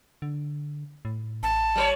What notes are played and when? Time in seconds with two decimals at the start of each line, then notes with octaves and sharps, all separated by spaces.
0.22 D3
1.05 A2
1.43 A1 A5
1.76 G3 A#4 C#5